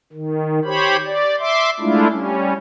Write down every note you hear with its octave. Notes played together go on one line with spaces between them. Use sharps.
D#3
G4 C5 C#5 B5
D5
E5 C6 D6
G#3 A3 D4 E4 F4
G3 C#4